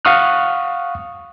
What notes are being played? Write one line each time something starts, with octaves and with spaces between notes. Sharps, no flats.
F5 F#5 C#6 D#6 F6 F#6